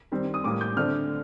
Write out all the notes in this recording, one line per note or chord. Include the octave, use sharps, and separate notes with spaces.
D#3 G3 C4
D#6
A2 G3 A#3 D6
G6
D3 A3 C4 F6